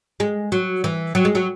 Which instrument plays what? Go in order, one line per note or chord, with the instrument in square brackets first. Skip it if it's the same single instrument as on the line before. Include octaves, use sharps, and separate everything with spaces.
[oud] G#3
F#3
E3
F#3
G#3
F#3